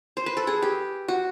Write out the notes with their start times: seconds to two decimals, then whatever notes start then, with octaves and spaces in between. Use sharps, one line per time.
0.17 C5
0.26 B4
0.37 A4
0.47 G#4
0.62 G4
1.08 F#4